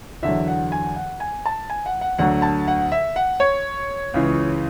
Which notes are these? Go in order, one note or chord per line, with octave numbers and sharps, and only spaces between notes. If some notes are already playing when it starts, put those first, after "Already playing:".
E2 D3 F#3 E5
F#5
G#5
F#5
G#5
A5
G#5
F#5
F#5
D2 D3 F#3 F#5
A5
F#5
E5
F#5
C#5
C#2 C#3 E3